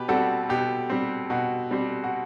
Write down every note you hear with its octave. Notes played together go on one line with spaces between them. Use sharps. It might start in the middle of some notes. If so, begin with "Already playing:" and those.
Already playing: B2 G4 B4
G3 C4 F#4 A4
B2 G4
G3 C4
B2 F#4
G3 C4
F#4